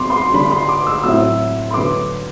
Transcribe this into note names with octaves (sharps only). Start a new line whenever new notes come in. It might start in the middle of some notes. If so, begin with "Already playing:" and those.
Already playing: B2 F#3 C4 C6 D6
C6
D3 G3 D4 B5
B5
C6
D6
E6
A2 F#3 C4 E4 E6
C6
D3 F#3 B3 D6